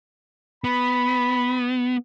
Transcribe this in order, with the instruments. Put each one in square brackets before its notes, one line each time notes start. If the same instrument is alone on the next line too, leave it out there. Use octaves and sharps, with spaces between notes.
[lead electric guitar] B3 [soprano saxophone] B5